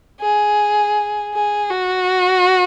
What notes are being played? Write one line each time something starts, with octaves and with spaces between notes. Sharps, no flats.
G#4
G#4
F#4